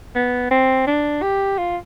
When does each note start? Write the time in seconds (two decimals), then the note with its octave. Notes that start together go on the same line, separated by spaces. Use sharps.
0.15 B3
0.51 C4
0.87 D4
1.22 G4
1.58 F4